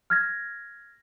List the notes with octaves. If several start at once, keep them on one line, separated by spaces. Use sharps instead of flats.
F6 G#6 A#6